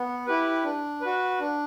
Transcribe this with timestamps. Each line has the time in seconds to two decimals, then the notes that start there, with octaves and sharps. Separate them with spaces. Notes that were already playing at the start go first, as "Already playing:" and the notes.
Already playing: B3
0.26 E4 G4 B4
0.64 D4
1.01 F#4 B4
1.40 D4